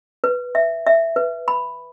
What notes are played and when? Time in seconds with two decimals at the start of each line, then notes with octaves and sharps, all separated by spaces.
0.24 B4
0.55 E5
0.87 E5
1.16 B4
1.48 B5